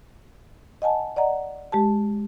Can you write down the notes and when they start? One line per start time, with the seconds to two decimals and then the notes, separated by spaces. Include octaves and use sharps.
0.82 D#5 F#5 G#5 A5
1.16 D5 D#5 F#5 A#5
1.72 G#3 G4 A5